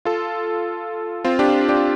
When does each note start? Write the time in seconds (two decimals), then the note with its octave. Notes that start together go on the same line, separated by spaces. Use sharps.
0.05 F4 A4
1.25 C4 F4
1.39 D4 G4
1.69 D4 G4